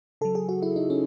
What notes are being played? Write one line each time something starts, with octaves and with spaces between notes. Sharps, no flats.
C#3 F#3 A4
G#4
F#4
E4
D#4
C#4